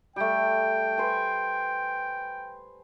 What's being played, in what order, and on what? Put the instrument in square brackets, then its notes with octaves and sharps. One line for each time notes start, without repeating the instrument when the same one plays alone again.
[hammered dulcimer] G3 A3 [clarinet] G5
[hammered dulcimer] B4 C5 G#5